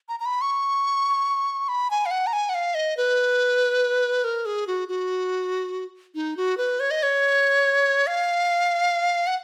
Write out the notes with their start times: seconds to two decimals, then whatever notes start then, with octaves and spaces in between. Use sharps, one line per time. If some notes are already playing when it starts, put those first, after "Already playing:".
0.09 A#5
0.20 A#5
0.25 B5
0.41 C#6
1.68 B5
1.90 G#5
2.06 F5
2.11 F#5
2.27 A#5
2.33 G#5
2.49 F#5
2.54 F5
2.74 D#5
2.97 B4
4.24 A#4
4.45 G#4
4.67 F#4
4.88 F#4
6.15 D#4
6.37 F#4
6.57 B4
6.80 C#5
6.91 D#5
7.03 C#5
8.07 F5
9.27 F#5